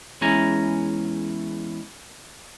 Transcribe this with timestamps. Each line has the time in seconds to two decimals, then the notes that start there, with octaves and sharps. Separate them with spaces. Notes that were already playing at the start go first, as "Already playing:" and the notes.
0.21 E2 G#3 C#4 E4 G#5 A#5